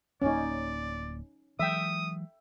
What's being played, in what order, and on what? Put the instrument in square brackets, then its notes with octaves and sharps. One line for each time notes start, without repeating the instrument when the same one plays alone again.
[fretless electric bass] D1 A#3 [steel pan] C#4 D#4 [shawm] D5
[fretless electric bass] E3 F#3 G#3 [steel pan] E5 G5 [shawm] D#6